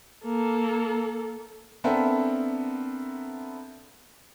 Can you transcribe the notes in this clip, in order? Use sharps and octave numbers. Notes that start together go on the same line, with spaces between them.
A#3 A4
B3 C4 D4 A4 A#4 E5